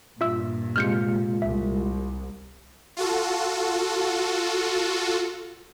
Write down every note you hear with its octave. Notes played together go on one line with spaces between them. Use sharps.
G2 A#2 F4 E5 E6
C3 G#3 F4 F6 G6 C#7
C2 E5
F4 F#4 A4